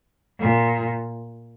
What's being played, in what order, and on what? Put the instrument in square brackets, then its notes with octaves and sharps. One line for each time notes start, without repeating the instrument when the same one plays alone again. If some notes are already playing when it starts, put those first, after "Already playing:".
[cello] A#2